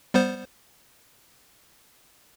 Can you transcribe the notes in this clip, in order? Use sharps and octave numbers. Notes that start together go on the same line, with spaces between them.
G3 B3 C5